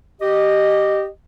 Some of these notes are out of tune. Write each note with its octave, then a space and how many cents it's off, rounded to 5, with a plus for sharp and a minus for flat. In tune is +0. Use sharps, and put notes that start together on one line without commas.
G4 -10 D#5 -15